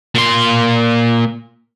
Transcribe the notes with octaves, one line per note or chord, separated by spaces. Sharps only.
A#2 C6